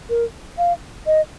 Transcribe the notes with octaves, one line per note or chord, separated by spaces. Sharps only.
A#4
F5
D#5